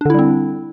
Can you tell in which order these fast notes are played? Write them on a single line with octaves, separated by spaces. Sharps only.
D4 D3 E4 G3 C4